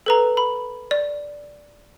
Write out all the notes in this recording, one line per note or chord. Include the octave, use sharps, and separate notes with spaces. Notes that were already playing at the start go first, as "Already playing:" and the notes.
A4 B4 A#5
B5
D5